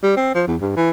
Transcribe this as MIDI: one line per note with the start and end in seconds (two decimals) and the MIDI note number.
0.03 0.16 55
0.17 0.32 60
0.35 0.45 53
0.47 0.56 40
0.61 0.72 43
0.77 0.91 52